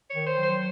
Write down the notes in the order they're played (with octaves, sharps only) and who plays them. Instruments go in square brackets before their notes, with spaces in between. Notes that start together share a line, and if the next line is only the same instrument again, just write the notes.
[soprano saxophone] C#5
[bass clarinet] D#3
[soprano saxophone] C5
[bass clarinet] F#3
[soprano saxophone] C5